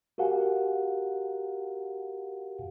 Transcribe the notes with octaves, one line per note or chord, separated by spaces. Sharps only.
F#4 G4 A#4 F5 F#5 G#5